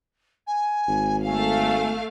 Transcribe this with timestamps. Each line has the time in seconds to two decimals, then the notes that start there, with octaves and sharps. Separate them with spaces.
0.47 G#5
0.88 G#1
1.26 A3 F5 G#5